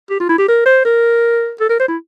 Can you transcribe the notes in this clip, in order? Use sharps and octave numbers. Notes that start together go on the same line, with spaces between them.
G4
F4
E4
G4
A#4
C5
A#4
A4
A#4
C5
E4